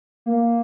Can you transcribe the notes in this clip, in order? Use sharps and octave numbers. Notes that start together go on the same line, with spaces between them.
A#3